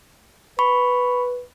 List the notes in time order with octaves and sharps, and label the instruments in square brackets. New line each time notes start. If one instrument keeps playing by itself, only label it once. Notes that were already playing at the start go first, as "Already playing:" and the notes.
[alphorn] B4 [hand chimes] B5 C#6